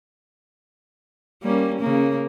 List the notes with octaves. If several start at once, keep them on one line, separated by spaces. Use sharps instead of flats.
G3 A#3 C#4
C#3 A#3